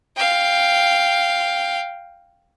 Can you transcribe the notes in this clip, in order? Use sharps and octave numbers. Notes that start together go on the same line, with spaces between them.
F5 G5